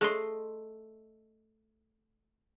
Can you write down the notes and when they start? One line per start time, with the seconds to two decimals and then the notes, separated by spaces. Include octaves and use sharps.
0.01 A3 G#4 D#5 C6